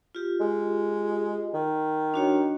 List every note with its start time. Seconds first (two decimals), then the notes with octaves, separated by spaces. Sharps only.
0.15 F4 G4
0.40 G#3
1.54 D#3
2.14 D4 F#4 C#5